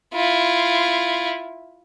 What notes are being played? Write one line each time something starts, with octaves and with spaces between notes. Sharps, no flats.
E4 F4